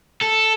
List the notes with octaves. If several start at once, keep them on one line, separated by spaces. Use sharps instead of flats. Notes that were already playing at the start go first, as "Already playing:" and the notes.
A4